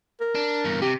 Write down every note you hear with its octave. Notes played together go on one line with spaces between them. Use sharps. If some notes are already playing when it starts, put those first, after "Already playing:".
A#4
D4
E2 G2
C3 G4